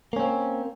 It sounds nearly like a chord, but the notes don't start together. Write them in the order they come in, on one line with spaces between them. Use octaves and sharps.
A#3 C#4 C4